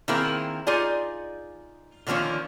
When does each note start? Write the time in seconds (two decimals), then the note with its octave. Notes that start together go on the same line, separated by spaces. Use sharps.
0.08 D#3 A#3 C4 E4 G#4 A#4
0.67 D#4 F4 G#4 D5 G#5
2.07 D3 D#3 F3 A#3 C#4